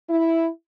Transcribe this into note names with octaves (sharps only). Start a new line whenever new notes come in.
E4